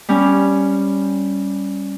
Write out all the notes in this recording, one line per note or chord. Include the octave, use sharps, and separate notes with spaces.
G3 C#4